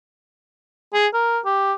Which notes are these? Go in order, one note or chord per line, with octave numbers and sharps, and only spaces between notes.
G#4
A#4
G4